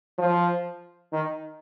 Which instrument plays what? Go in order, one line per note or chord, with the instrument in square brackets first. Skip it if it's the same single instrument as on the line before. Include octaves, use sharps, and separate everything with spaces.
[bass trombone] F3
D#3